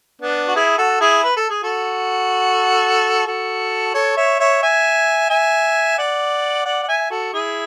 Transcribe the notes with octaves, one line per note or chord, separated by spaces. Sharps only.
B3 D4
F#4
E4 G#4
F#4 A4
E4 G#4
B4
A4
G#4
F#4 A4
F#4 A4
A4 C#5
C#5 E5
C#5 E5
E5 G#5
E5 G#5
D5 F#5
D5 F#5
F#5
E5 G#5
F#4 A4
E4 G#4